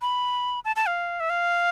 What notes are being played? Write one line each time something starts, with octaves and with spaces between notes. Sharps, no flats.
B5
A5
A5
F5
E5
F5